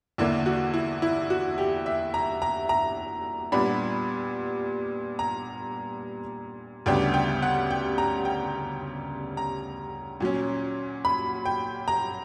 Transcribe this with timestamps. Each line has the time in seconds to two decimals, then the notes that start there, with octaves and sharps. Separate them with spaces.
0.18 E2 D3 A#3 D4 E4
0.46 F#4
0.74 E4
1.02 E4
1.30 F#4
1.58 G4
1.86 E5
2.14 A#5
2.42 A#5
2.69 A#5
3.52 A#2 G3 B3 D4 B5
5.19 A#5
6.86 D2 C#3 G3 B3 D4 G5
7.14 G5
7.42 F#5
7.71 G5
7.98 A#5
8.25 G5
9.37 A#5
10.20 A#2 F#3 C#4
11.05 B5
11.46 G5
11.88 A#5